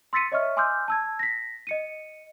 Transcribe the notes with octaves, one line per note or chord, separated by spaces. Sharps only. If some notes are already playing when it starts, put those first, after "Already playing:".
C6 E6 A6 B6 C#7 D#7
C#5 D#5 E5 C#6 F6
G#5 C6 D6 E6 F6 G6
A5 E6 G#6
A#6 B6
D#5 C#7 D#7